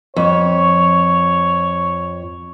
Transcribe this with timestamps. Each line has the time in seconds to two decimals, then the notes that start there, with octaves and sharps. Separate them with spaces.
0.16 F2 C#5